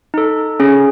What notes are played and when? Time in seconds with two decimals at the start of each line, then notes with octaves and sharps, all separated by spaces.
0.14 D#4 A4
0.60 C#4 G#4